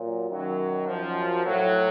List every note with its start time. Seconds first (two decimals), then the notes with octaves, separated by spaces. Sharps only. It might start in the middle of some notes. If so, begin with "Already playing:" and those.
Already playing: A#2 F#3
0.31 F#2 D#3 F#3
0.87 F#2 F3
1.45 A2 F#3